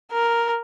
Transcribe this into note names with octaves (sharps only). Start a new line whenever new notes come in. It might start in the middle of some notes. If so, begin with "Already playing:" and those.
A#4